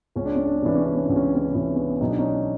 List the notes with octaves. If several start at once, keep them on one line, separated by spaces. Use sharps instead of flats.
C#2 C#4
D4
C#4
D4
C#4
C3 E3 D4
C#4
D4
C#4
C#2 D4
C#4
D4
C#4
D4
C3 E3 C#4
D4
B3 C#4
B1 D#4
D4
C#4 D#4